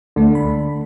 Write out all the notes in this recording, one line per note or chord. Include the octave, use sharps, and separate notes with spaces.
D2 D3 A3
B5